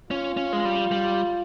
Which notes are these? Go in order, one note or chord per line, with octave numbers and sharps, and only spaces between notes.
C#4 F4
C#4
G#3
G3
G3